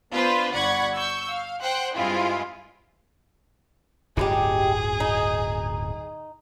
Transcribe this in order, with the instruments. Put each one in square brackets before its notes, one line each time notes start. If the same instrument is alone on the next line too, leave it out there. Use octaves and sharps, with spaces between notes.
[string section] B3 D4 F4 B4 C5
G1 D5 F#5 B5 C#6 G#6
C#6 E6 G6
F5
C5 F#5 G5 F#6
G2 G#3 C4 E4 F4
[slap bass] D1 G1 C3 [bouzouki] D#4 E4 G4 [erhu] G#4
[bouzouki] D#4